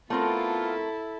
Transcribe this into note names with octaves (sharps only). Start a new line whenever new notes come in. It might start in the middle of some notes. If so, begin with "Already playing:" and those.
A3 B3 C4 E4 F4 A4 A#4